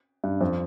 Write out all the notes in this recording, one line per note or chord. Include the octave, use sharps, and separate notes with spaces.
G2
F2